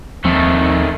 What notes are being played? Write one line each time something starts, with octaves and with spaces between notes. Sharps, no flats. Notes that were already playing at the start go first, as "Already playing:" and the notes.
D#2 D#3 F3 A3 C4